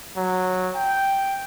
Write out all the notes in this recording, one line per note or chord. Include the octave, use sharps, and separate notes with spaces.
F#3
G5